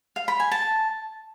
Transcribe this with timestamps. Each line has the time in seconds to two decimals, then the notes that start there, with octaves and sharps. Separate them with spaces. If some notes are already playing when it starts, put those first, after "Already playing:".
0.16 F5
0.28 B5
0.40 G#5
0.51 A5